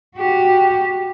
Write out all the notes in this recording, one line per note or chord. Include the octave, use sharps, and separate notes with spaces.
F#4 G4